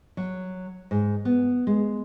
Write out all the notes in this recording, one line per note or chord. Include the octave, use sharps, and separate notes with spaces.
F#3
G#2
B3
G#3